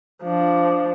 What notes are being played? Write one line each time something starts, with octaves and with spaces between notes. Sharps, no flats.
F3 D4